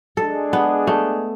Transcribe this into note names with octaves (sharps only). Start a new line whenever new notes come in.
G#3 D4 G#4 A4
B3
A3